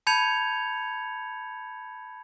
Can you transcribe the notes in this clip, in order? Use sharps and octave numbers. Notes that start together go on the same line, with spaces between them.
A5 B5 G6 G#6 C#7 F7